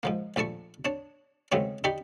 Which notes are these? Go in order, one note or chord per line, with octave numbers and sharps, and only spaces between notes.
G#2 F3 A#3
A#1 A3 D5 A5 C#6
D4 C#5 A5
G#2 C#3 F#3 A3 B3 C4
D#4 G4 D5 B5 C#6